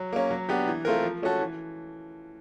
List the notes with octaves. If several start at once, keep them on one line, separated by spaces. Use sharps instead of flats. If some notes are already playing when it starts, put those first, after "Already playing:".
Already playing: F#3
A#3 C#4
F#3
B3 D4 G4
E3
A3 C4 F4 A#4
F3
A3 C#4 F#4 A4
E3